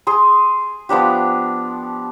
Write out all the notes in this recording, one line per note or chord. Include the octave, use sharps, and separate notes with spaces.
G#4 C6
F3 B3 D4 G4